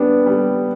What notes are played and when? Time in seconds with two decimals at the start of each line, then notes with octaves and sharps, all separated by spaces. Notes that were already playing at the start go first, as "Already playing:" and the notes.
Already playing: G3 B3 D4
0.26 G3